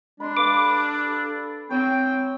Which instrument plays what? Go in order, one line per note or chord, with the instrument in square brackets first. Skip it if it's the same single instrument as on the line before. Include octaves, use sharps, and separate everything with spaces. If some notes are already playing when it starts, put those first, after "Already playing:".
[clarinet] G#3 [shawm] D4 [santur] B5 C6
[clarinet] A4 [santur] B4 F5 [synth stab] D6
[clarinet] C4 [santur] C#5 [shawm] G5